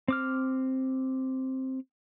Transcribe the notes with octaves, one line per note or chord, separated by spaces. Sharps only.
C4 D6 F6